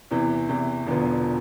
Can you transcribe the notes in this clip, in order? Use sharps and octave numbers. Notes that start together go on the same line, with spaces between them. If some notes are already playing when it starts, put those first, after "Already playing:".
E2 C3 E3
E2 C3 E3
E1 E2 D3 F3 B3